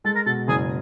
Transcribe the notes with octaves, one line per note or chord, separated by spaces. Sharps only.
G#3 A4
A#4
B2 A4
F#1 G#4